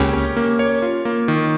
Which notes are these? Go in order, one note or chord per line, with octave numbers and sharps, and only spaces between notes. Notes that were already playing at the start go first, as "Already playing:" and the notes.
Already playing: C#2 C#3 A#3 G4 C#5
C#4
A#3
C#5
F4
A#3
D#3